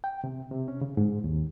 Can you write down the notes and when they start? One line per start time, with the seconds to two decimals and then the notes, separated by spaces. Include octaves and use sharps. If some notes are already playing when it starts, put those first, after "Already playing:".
0.04 G5
0.24 C3
0.51 C3
0.68 C#4
0.81 C#3
0.97 G#2
1.24 D#2